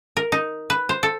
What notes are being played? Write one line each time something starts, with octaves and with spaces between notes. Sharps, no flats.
A#4
D#4
B4
C5
A4